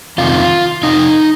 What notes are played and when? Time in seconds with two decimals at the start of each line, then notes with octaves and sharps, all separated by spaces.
0.18 F2 C3 D#3 F4
0.83 F2 C3 D#4